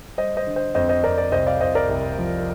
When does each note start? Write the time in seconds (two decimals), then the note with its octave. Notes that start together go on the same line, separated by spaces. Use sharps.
0.18 G3 C5 D#5
0.37 C5 D#5
0.47 D3
0.56 C5 D#5
0.75 F2 C5 D#5
0.89 C5 D#5
1.04 F2 A#4 D5
1.18 A#4 D5
1.32 C2 C5 D#5
1.47 D5 F5
1.61 C2 C5 D#5
1.75 A#4 D5
1.89 C2
2.18 F3